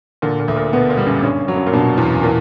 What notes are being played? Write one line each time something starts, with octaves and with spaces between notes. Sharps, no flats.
A#2 D3
A#2
D2
A#2
B2 B3
A#2
G3
F#2
G2 C#4
F#3
F#2
A#2
G2 B2
E2
A#2 E3